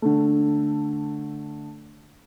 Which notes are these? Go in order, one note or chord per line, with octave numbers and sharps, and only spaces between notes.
D3 A3